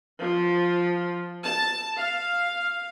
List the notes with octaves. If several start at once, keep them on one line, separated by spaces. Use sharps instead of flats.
F3
A5
F5